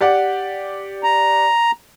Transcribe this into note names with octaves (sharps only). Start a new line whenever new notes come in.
G4 D5 F#5
A#5